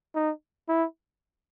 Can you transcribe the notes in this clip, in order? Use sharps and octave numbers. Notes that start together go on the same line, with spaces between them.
D#4
E4